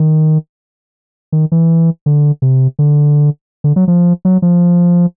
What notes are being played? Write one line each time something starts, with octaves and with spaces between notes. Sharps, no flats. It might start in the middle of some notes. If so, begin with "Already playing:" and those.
Already playing: D#3
D#3
E3
D3
C3
D3
D3
F#3
F3
F#3
F3